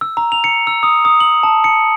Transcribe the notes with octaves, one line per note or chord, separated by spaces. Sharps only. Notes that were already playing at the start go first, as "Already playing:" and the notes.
E6
A#5
F7
C#7
E6
D#6
D#6
F#7
A5
C#7